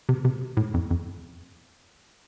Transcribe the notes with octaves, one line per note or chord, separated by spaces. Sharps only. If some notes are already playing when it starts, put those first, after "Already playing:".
C3
C3
A2
F2
F2